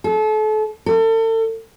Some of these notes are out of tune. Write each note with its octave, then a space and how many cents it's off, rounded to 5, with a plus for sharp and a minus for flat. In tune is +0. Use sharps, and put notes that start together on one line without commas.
A4 -35
A4 +40